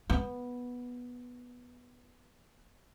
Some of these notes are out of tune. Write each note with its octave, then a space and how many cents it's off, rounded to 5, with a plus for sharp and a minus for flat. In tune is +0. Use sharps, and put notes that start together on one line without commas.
B3 -5